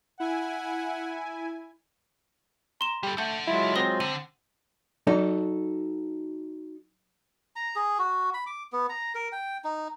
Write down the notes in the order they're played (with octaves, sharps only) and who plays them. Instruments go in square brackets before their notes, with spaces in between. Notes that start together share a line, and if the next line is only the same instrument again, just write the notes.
[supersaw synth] E4 G#5 [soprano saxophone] F#5
[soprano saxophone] A#5 [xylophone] C6 E7
[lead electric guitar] G3 A4 [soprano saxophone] G4
[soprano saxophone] A3 [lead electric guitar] A4 F#5 [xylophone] G6
[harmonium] F#3 G#3 F4 [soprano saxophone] E4
[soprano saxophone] C4 [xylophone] C6 D#6 A#6
[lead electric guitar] D3 [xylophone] D#7
[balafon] F#3 [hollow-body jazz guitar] D#4 F#4 A4
[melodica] A#5
G#4
F#4
B5
D6
B3
A#5
A#4
G5
D#4